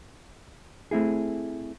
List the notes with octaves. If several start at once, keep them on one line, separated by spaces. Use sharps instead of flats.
A3 C4 E4 G#4